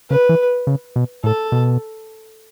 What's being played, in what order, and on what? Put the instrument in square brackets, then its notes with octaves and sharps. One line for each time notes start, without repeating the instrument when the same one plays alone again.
[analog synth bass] C#3 [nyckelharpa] B4
[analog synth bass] E3
C#3
B2
[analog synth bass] A2 [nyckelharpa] A4
[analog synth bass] B2